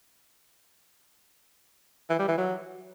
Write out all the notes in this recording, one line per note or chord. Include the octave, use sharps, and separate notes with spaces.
E3
G3
E3
F#3